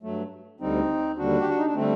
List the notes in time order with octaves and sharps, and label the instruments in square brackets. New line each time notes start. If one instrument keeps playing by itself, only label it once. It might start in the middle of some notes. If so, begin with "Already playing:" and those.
[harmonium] G2 F#3 A3
D2 D3 G3 C4 D#4
D#2 D3 G3 D4 F#4
G4
F#4
D#4
D4
D3 G3 A3 C4